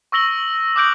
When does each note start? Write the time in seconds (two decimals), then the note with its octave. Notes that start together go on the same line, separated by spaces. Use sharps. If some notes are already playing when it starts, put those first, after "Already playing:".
0.12 C#6 E6 A#6 F#7 G7
0.76 D6 D#6 F#6 G6 D7 F#7